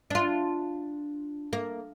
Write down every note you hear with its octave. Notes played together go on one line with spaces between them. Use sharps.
D4 F4
A#3